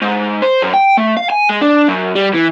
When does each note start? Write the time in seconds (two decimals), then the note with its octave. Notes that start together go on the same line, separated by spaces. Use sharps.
0.02 G#2
0.42 C5
0.62 F#2
0.74 G5
0.98 A3
1.17 F5
1.30 G#5
1.49 G#3
1.61 D4
1.89 F#2
2.15 G3
2.34 E3